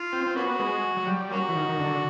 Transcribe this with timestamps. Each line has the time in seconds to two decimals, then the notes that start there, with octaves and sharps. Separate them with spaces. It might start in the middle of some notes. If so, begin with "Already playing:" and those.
Already playing: F4
0.13 C4
0.26 C4
0.36 A#3 B3 C#4 F#4
0.60 G#3
0.97 F#3
1.07 G3
1.32 A#3 C#4 F#4
1.49 E3
1.55 D#3
1.69 D#3
1.79 D3